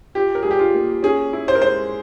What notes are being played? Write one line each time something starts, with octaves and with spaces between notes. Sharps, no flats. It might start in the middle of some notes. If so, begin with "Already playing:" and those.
F4 G4
A#4
G3 G#4
G4
F4
A#3
C#4 G#4
E4
C5
A#4
G#3 C5